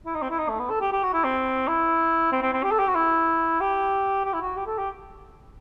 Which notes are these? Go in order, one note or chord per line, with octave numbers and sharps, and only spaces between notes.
E4
D#4
C4
E4
D#4
A3
B3
A4
G4
G4
F#4
E4
C4
E4
C4
C4
C4
G4
A4
G4
F#4
E4
G4
G4
E4
F#4
G4
A4
G4